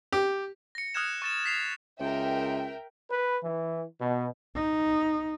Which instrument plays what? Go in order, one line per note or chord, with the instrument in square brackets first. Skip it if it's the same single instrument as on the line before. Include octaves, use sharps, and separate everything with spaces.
[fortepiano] G4
[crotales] A#6 C#7
D#6 F6 F#6 G#6 E7
C#6 A6 E7
A6 B6 C7 F7
[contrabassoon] C#2 [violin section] A#4 E5 G5
[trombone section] B4
E3
B2
[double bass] D#4